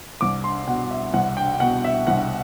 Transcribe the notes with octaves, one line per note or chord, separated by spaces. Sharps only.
C2 D6
C6
B2 F#5
E5
C2 F#5
G5
B2 F#5
E5
C2 F#5